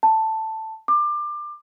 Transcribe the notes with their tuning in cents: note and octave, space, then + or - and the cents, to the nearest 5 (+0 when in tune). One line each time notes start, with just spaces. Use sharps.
A5 +5
D6 +25